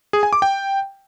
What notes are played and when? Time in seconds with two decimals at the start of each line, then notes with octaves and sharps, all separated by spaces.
0.13 G#4
0.23 G#5
0.33 D6
0.42 G5